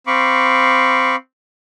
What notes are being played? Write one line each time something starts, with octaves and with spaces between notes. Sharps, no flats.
C4 F5 B5 C#6 D6